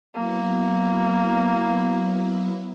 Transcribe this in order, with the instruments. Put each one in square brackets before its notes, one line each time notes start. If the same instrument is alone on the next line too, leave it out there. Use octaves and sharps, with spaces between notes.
[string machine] F#3 B3 E4 [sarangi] A#3